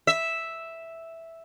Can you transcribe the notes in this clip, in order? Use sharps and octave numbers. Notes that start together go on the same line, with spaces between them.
E5